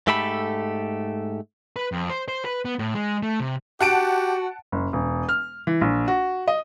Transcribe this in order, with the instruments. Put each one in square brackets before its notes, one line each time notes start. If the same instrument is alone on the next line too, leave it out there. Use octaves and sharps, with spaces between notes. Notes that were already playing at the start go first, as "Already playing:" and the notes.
[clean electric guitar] G#2 A3 G4 A4 B5
[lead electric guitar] B4
F2
C5
C5
B4
B3
A2
G#3
A3
C3
[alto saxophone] F#4 [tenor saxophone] G4 [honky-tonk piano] F#5 A5 D7
[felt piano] F#1
E1
F6
E3
A#1
F#4
D#5